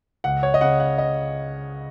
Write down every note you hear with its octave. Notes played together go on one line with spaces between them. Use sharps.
C#2 F#5
C#5
D#5
C#3 F#5
F#5
D#5